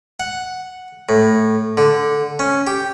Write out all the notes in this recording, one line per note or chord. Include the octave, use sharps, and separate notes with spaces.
F#5
A2
D3
C#4
G4